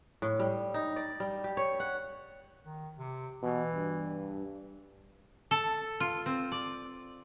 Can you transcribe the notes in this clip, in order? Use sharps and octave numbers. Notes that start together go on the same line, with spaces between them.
A2
G3
D#4
D5
G3
G4
C#5
F#5
D#3
C3
B2 E3
G2
A4
F4
C4
D5